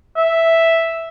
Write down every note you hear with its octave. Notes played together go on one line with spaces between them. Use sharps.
E5